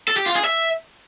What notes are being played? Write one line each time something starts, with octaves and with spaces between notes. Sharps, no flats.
A4
G4
F4
G#4
E5